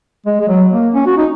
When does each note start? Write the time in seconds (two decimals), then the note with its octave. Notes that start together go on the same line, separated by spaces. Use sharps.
0.26 G#3
0.40 G#3
0.48 F#3
0.72 A#3
0.94 C#4
1.06 F#4
1.17 D#4